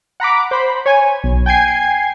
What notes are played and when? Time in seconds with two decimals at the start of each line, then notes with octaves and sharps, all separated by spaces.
0.20 F#5 A#5 B5 D6
0.51 C5 B5
0.86 C#5 G#5
1.24 B1
1.46 G5 G#5 G#6 C7